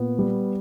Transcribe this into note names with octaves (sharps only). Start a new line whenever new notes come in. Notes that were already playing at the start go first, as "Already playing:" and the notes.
Already playing: A#2 B3
G3